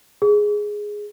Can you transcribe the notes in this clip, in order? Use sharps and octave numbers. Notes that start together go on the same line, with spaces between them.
G#4